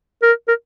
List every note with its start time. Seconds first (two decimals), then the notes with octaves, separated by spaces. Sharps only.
0.23 A#4
0.48 A#4